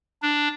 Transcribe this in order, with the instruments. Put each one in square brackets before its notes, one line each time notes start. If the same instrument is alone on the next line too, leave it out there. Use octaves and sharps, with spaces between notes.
[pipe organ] D4